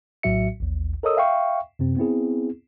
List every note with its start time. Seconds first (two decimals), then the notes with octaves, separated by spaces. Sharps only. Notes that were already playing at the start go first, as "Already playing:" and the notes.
0.23 A#1 A2 F#3 F#4 E5 C#7
0.60 A1 D#2
1.03 A4 A#4 C#5 D#5 D#6 E6
1.17 E5 F5 G5 C#6
1.79 F#2 C3 C4
1.97 B3 C4 E4 G#4